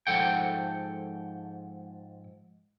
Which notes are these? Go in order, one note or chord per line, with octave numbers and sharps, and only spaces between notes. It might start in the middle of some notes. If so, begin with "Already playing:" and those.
G#2 F3 A4 F#5 G5